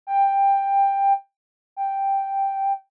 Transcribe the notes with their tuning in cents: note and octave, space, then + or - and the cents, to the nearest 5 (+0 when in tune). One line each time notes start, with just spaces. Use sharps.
G5 +15
G5 +0